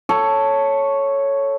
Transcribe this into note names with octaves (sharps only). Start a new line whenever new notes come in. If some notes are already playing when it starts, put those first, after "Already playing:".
A4 C#5